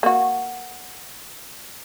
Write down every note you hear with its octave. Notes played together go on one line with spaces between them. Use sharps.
A#3 F#4